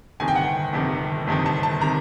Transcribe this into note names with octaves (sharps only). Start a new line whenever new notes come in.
G1 F2 C3 D#3 G#5
G5
F#5
G5
G1 F2 C3 D#3
G1 F2 C3 D#3
A5
A5
C3 D#3 A#5